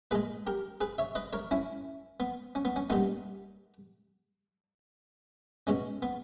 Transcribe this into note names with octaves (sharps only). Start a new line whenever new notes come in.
A#2 G#3 G#4 B4
G4 A#4
G#4 B4
C#5 E5
B4 D#5
A#4 C#5
C#4 E4
B3
C#4
B3
C#4
A#2 G3 B3 D#4
B2 G#3 C#4
B3